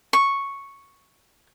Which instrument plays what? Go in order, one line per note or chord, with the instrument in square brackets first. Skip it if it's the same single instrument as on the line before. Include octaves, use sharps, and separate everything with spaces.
[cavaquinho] C#6